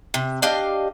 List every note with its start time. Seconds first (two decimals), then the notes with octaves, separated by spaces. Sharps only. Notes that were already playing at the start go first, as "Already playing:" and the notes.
0.14 C3
0.42 D4 G4 D#5 F5